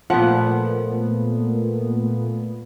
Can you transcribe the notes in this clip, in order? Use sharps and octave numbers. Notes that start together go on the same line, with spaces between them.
A#2 F3 A3 B3 F#5